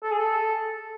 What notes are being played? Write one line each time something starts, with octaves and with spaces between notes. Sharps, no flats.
A4
G#4
A4